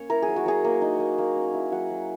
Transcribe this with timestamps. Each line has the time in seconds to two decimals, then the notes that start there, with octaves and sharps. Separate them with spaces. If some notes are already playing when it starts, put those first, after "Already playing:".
Already playing: A#3 C#4 C#5
0.10 E4 A#4
0.22 G#4
0.28 F#3
0.36 F#4
0.46 F#3 G#4
0.65 A#3
0.82 D#4
1.00 A#3
1.18 A#3
1.36 C#4
1.54 E4
1.72 F#3 F#5
1.90 F#3